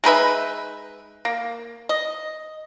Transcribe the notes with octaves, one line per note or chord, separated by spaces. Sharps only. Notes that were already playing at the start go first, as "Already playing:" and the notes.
G#3 D#4 B4 E5
A#3
D#5